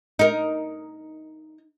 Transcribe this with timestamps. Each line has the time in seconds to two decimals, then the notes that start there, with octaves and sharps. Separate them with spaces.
0.19 D#4 A#4